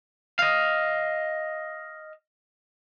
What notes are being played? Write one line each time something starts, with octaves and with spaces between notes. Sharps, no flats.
D#5 F5